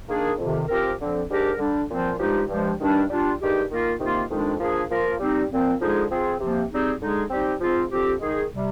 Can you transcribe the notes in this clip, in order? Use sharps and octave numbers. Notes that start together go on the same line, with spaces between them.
D#3 A#3 D4 G#4
F2 C3 D#3
F3 C4 G4 A#4
D3 F3 C4
G#2 G3 D4 G4 A#4
D3 G3 D4
A#2 F3 C4 F4
G2 F3 G#3 D#4 G4
G2 F3 G#3
G2 D#3 G3 D4
G3 D4 F4
G2 D#3 G#3 D#4 G4
D#3 A#3 F4 A#4
C3 D#3 A#3 F4
F2 D#3 G#3 D4
F3 A#3 D4 G#4
F3 A#3 F4 A#4
G3 C4 D#4
A#2 F3 C4
D3 F3 G#3 D#4 G#4
F3 C4 F4 G#4
C3 F3 A#3
G3 C4 D#4 G#4
D3 G#3 D#4 G#4
G3 C4 D#4 G4
G#2 F3 C4 F4
D3 F3 C4 G4
D#3 G#3 D#4 G#4
C3 G3